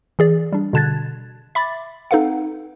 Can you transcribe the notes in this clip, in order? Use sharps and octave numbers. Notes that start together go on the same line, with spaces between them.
E3 G#4 D5
G3 D4
B2 D3 A5 F#6 G#6 A6
E5 B5 D6 A6
C4 D#4 A4 B4 F5 F#5